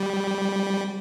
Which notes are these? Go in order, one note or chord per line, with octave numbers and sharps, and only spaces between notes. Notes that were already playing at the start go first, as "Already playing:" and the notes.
Already playing: G3